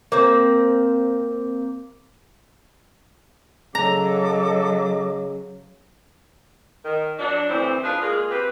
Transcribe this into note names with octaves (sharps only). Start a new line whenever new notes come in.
A#3 C4
C#3 F#3 A4 D#5 A#5 D6
D#3
F#3 D4
D2 A2 E3 C4 C5
D4 F4 G#4 B4
G#3 A#3 F4 G#4
C4 G4 B4